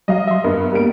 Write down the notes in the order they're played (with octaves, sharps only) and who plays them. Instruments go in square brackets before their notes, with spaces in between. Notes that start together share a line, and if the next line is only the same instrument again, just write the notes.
[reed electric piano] F#3 G3 [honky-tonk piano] D#5 F5
[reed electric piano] E5 C6
[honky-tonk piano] G2 [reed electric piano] B3 A#4
[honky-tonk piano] G3 A#3 D7